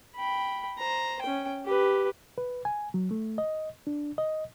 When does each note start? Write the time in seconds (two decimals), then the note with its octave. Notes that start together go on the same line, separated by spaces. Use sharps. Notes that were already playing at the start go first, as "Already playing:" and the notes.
0.16 G5 B5
0.78 C5 A#5
1.22 C#4 G5
1.65 G4 B4
2.38 B4
2.65 G#5
2.94 F#3
3.11 A3
3.38 D#5
3.87 D4
4.18 D#5